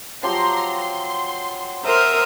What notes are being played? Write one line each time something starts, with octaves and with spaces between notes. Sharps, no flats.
F3 F#3 G4 A#5 C6
C6
A#4 C5 E5 A#5 C6 D#6 F6